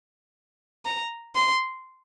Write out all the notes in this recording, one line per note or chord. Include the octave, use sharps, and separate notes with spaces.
A#5
C6